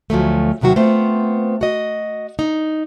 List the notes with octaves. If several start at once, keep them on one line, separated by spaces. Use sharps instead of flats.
D2 F3 F#3 A3
D#2 C3 D#3 F#3 F#4
A3 B3 C4 F4 C5
F#4 D#5
D#4